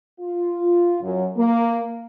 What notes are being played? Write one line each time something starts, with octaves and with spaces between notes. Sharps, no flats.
F4
F#2
A#3